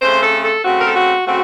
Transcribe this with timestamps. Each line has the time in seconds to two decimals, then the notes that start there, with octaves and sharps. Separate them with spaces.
0.02 C#3 A3 C4 C5
0.23 A4
0.43 A4
0.65 C#3 A3 C4 F#4
0.79 A#4
0.87 A4
0.96 F#4
1.27 C#3 A3 C4 F#4